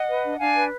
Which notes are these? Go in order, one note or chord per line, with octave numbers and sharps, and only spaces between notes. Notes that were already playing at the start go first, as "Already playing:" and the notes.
Already playing: D#5 F#5
B4
D4
D4 F5 G#5
B4